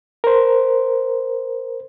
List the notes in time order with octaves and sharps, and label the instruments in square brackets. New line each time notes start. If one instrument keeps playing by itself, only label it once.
[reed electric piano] A#4 C5